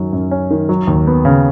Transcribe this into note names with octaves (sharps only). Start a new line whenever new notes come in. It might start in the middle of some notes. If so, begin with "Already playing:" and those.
Already playing: F#2 D#3 F#3 C#4
F#2
C#4
D#3
F#3
D#2
B3
C#3